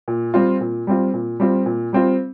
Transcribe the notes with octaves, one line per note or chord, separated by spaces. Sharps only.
A#2
G3 C4 F4
A#2
G3 C4 F4
A#2
G3 C4 F4
A#2
G3 C4 F4